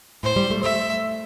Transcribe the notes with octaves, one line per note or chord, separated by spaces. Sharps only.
A2 C5
G3
A3
A3 E5